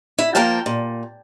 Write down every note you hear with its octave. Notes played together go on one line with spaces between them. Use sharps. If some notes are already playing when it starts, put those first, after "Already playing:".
E4
F3 A#3 A#4 G5 A5
A#2